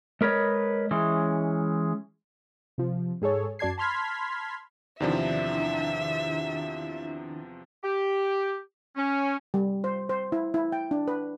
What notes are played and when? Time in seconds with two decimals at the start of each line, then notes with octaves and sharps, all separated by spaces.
0.21 G#3 A#4 B4 C#5 D#5
0.91 E3 G#3 C#4
2.78 C3 F3
3.22 G#2 G#4 A4 C#5
3.59 F#2 F#4 D5 A5 G#6 C7
3.78 A5 B5 C6 F6 G#6 B6
5.00 E2 C3 D#3 F3 D4 E4 E5
7.84 G4
8.97 C#4
9.54 G3
9.84 C5
10.09 C5
10.32 E4
10.54 E4
10.72 G5
10.91 D4
11.08 B4